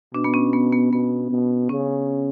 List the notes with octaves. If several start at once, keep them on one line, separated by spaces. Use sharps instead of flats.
B2 D4
B3
C#4
B3
B3
B2 B3
B2
C#3 C#4